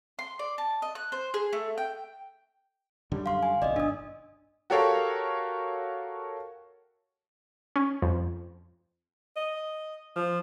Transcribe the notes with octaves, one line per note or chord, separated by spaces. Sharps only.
C6
D5
A5
D#5
F#6
C5
G#4
A3
G5
F#2 D3 G3
F5 C6
G#5
F#1 B1 D5 D#5
G1 D4 D#6
F#4 G4 A4 A#4 C#5 F5
C#4
F2
D#5
F3